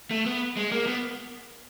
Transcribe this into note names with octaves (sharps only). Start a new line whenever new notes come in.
A3
B3
G#3
A#3
B3